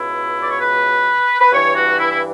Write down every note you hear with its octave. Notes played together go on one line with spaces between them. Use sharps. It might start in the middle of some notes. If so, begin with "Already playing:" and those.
Already playing: C#2 B2 E4
D5
C#5
B4
B4
G2 E3 C#5
F#4
E4
E4